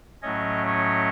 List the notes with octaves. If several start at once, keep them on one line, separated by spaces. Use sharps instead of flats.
A2 F#3 A3 C#4 C#5 D#5
C#5 D#5